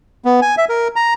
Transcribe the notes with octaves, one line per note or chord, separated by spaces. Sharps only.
B3
G#5
E5
A#4
A#5